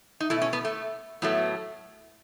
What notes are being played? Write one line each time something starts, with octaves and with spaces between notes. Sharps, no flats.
D#4
B2 A3 E4
C#4
B3
A3
A2 F#3 A3 B3